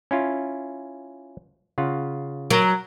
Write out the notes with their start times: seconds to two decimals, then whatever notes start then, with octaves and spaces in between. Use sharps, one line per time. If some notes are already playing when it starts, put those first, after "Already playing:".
0.11 C#4 E4 F4
1.78 C#3 F4 F#5
2.50 F#3 A#4